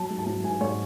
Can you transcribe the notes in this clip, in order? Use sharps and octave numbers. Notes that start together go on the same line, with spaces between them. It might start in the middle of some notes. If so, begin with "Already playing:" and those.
Already playing: F#3 A5
G#2
A5
F#3
G#2 G#5
G#2 C#5